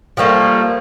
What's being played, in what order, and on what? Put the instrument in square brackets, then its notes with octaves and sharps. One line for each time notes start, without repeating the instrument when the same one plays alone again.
[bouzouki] F3 G3 A3 A#3